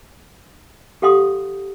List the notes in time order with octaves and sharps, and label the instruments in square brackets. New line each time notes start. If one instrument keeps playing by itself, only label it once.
[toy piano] G4 A4 F5 F#5 C6 D#6